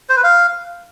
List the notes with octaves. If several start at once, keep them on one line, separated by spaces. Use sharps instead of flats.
C5
B4
F5